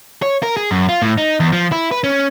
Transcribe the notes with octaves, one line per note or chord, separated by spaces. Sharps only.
C#5
A#4
G#4
F#2
F4
A2
D#4
E2
F3
E4
B4
C#4